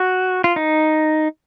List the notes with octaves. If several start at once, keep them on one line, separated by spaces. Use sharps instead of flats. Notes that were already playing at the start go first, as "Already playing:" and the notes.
Already playing: F#4
F4
D#4